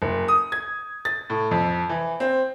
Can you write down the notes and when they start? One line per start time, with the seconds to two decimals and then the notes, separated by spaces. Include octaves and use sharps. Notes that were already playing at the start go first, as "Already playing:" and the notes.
0.02 F#1
0.28 D#6
0.52 G#6
1.05 A6
1.30 A2
1.51 F2
1.89 E3
2.20 C4